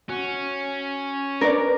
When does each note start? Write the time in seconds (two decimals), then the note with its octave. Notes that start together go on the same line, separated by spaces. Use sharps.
0.09 C#4 F#4
1.41 D4 A#4 B4 D5